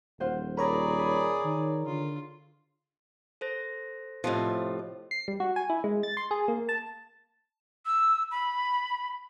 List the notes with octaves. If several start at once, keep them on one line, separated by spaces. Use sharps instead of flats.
D#1 F4 C5 F#5
G#4 A#4 C#5 D5 A#5 B5
B5
D#3
D3 F4
A4 C5 A#6
A2 C3 F3 F4 C5 D#5
C7
G3
F#4
G#5
E4
G#3
A6
C6
G#4
A#3
A5
E6
B5